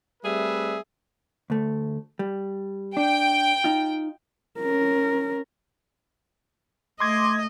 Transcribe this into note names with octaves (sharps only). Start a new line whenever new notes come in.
G3 A3 C4 G#4 B4 E5
D2 A3
G3
D4 G5
D#4 F4
C#4 A#4
A3 D#5 C6 D6 G#6